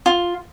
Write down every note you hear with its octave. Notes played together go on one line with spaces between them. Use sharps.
F4